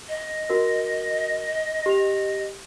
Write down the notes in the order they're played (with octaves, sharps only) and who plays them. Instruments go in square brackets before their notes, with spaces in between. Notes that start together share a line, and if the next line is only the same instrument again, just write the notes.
[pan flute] D#5
[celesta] F#4 A#4
G4 F7